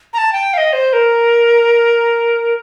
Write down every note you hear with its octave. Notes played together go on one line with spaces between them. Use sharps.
A#5
A5
G5
F5
D#5
C5
A#4